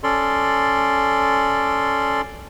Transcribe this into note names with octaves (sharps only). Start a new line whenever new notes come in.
C#4 A4 D5 C6